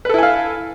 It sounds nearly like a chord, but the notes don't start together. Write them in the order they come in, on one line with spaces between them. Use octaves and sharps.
B4 A4 E4 G#5 F5